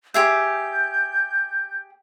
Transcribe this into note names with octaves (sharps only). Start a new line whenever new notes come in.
G4 G#4 E5 G6